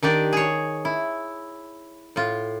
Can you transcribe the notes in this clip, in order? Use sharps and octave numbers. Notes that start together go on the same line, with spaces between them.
D#3 D4 G4 D5
G#4 C#5
E4
A2 F4